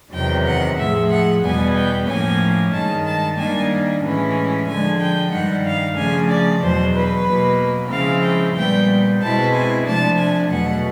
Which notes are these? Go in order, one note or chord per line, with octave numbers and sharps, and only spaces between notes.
E2 C3 D#3 F#3 G5
F#5
A2 F3 G#3 E5
F#5
E2 B2 G3 B3 G#5
G5
A2 F3 A#3 C#4 G#5
G2 D#3 G#3 A5
A5
D#3 G3 A#3 D4 G#5
A2 E3 G#3 C#4 E4
D3 F3 G#3 G#5
G5
G2 D#3 G3 F#5
F5
C#3 F3 A3 D4 G#5
D5
E2 B2 F#3 C5
B4
B2 F#3 A#3
C#3 F3 G#3 C4 E4 F5
G5
A#2 G3 B3 G5
B2 G#3 C4 E4 A5
G#5
C3 F3 A3 D4 A5
G#5
E2 B2 F#3 A3 F#5